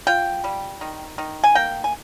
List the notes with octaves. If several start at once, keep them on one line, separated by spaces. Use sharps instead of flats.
F4 G5
G3
D#3
D#3
G#5
A#3 G5
G#5